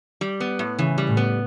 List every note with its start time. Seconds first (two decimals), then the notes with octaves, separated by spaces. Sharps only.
0.21 G3
0.40 B3
0.59 A2
0.79 C#3 E3
0.98 G3
1.08 A2
1.17 B3